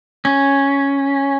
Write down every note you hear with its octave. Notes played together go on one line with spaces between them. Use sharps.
C#4